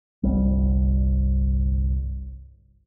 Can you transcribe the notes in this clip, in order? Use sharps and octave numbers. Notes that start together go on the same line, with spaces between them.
G1 C2 G3